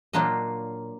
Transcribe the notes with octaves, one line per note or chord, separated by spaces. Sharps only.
A#2 F#3 A#3 D4 F4 D#5